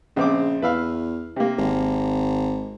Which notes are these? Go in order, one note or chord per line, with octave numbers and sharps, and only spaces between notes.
A#1 C#3 C4 D6
E2 B4 E5 F5
C3 A#3
G#1